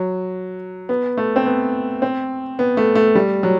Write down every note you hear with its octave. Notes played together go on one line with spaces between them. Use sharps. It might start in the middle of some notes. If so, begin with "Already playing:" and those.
Already playing: F#3
B3
A3
C4
B3
C4
B3
A3
A3
G3
F#3